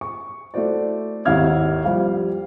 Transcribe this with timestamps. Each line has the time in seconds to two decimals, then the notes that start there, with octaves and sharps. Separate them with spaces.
0.01 C#6
0.54 A3 E4 F#4 C5 D5
1.25 G#1 D#2 E4 F5 F6 G#6
1.85 F3 G3 F5